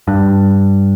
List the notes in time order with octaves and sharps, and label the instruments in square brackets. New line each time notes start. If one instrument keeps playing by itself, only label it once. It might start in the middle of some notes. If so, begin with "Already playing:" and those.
[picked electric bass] G2